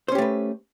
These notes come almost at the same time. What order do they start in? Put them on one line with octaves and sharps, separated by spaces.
C5 C#4 G4 A3 B4